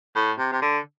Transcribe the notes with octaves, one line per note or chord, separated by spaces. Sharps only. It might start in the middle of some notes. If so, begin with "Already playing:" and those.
A2
C3
C3
D3